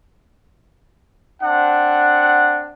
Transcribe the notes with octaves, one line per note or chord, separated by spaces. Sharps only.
C4 D4 F#5